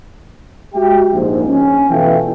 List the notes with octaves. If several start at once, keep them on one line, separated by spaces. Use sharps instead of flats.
G#3 F#4 G4 E5 G5
A#1 G#2
C#4
B2 E3 A3 F4 G5